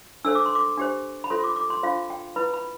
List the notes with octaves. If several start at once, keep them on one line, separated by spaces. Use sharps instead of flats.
D4 A4 C5 E6
D6
C6
D6
D4 G4 C5
B5
F4 A4 C5 C6
D6
D6
C6
D4 F4 C5 F5
G5
E4 B4 B5
B5